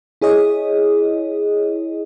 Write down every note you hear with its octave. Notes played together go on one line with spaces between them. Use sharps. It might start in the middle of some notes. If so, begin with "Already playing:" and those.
E4 G#4 C#5 D#5